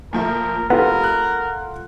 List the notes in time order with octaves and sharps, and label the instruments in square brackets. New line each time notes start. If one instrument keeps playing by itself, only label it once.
[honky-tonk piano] A#2 F3 A3 [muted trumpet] A#4
[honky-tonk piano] F1 [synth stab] B3 [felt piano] F4 A4 F#5 [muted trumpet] A#4
[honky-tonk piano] F#6